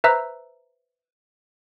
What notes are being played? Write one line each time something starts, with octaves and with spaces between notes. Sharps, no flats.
B4 C5 E5 A#5 E6